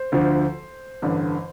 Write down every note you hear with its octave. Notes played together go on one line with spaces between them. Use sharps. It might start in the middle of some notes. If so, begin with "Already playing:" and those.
Already playing: C5
D2 D3 F3
A1 G2 D3